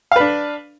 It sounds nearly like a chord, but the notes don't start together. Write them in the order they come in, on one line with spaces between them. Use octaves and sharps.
F5 B4 D4